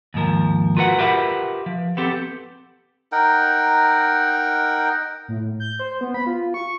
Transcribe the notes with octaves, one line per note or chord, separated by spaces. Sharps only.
D#2 G#2 F3 A#4
F4 F#4 A#4 B4 C#5 F#5
F4 G4 A#4 B4 E5 F#5
F3
B3 C4 G4 A4
D#4 A#4 F#5 G5
A2
G6
C5
B3
B5
F4
C#6